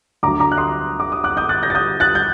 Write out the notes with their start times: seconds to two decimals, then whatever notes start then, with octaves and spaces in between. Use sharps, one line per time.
0.23 D2 D3 F#3 A#5 D6
0.40 A#5 D6
0.52 F#6
0.58 C6 D#6
1.00 D6
1.12 D#6
1.24 D6 F#6
1.37 D#6 G6
1.49 F#6 A6
1.63 G6 A#6
1.70 A6
1.75 D#6 G6
2.00 F#6 A6
2.15 G6